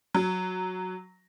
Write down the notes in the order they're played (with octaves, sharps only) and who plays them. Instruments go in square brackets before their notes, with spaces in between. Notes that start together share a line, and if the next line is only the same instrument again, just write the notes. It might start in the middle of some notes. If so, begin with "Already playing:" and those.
[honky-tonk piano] F#3